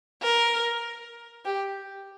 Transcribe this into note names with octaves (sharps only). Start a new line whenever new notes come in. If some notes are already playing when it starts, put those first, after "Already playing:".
A#4
G4